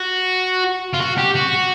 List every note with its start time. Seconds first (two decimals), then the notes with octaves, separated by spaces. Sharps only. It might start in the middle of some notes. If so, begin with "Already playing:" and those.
Already playing: F#4
0.94 F4
1.01 F#4
1.18 G4
1.35 F#4